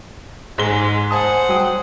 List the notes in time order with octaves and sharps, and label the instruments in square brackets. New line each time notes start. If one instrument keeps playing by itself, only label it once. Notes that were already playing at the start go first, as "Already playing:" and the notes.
[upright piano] G#2 G7 [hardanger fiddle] G#3
[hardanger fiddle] C5 F#5 [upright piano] G#5 A5 D#6
[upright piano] F#3 G5 D#6